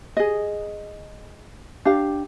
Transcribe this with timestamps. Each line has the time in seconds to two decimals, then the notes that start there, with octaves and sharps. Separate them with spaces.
0.17 G#4 D#5
1.85 D4 G4 F5